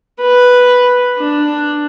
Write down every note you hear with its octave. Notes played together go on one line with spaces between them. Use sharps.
B4
D4